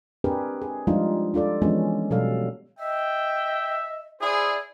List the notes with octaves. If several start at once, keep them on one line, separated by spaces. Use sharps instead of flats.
C4 D4 G4 G#4 A#4 B4
G#4
F3 G3 G#3 D4 D#4 F4
D4 F4 A4 D5
E3 F3 G#3 B3 C#4 D4
B2 F#3 G3 A4 F5
D#5 E5 G5
E4 G#4 C5 D5